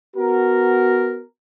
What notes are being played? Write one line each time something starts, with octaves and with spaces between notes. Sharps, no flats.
B3 F#4 A#4